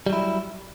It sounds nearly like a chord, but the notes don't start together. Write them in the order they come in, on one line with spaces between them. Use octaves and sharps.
G3 F#3 E4